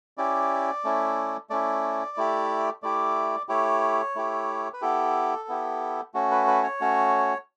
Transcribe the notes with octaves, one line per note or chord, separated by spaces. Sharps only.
C#4 E4 G4 D5
A3 C#4 E4
A3 C#4 E4 D5
A3 E4 G4
A3 E4 G4 D5
A3 E4 G4 C#5
A3 E4 G4
B4
B3 E4 G4 A4
B3 E4 G4
A3 C#4 F#4
B4
B4
C#5
A3 C#4 F#4